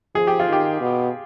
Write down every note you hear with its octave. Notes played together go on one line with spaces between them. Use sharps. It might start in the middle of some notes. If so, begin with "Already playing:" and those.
F3 G#4
G4
F4
D#3 G4
B2